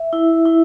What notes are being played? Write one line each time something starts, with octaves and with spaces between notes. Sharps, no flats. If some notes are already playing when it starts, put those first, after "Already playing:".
Already playing: E5
E4
E4